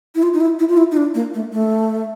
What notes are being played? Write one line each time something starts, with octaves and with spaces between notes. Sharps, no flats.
E4
F4
D#4
E4
E4
F4
E4
D#4
D4
A#3
A3
A3